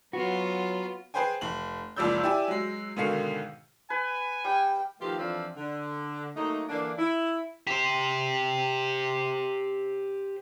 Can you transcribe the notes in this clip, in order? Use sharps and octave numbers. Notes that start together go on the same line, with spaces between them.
F#3 B3 F4 F#4
G#4 B4 C5 G5 G#5
F1 F#7
F#1 C#2 F3 D5 E6 G6
E4 G4 D5 G#5
F#3 G#3
G#2 B2 D3 D#3 F5 C#7
B4 G#5
G3 G5
B2 D#3 F3 A3 F4 G4
F2 E3 F3 C4 D4 F4
D3
F#3 A3 A#3 D#4
D3 E3 A#3 D4
E4
G4 C5